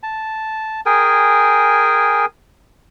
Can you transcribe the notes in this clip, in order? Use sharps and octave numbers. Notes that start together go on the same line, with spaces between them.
A5
G#4 A#4 G5 G#5